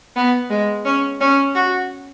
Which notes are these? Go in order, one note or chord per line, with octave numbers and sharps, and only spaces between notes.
B3
G#3
C#4
C#4
F#4